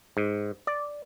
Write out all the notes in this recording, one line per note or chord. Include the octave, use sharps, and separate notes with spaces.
G#2
D5